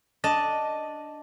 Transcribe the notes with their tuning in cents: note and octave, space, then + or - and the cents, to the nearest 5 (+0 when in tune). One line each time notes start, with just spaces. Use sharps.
D4 +0 D#5 +0 A5 +0